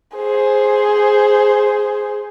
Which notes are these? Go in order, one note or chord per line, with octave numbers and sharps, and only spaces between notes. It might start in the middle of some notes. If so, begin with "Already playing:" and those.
G#4 C5